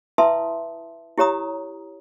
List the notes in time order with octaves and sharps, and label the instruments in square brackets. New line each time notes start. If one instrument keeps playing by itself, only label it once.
[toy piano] E4 B4 E5 A5 C6 D#6
E4 G4 C#5 A#5 D#6